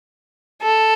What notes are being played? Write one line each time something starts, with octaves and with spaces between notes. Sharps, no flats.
A4